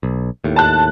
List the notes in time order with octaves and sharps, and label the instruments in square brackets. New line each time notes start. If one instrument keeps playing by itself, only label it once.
[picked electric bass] B1
D#2 A2
[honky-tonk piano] A5 F#6